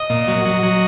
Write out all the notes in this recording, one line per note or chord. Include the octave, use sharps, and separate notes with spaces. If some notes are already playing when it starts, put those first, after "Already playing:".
Already playing: D#5
A#2
F#3
F#3
F#3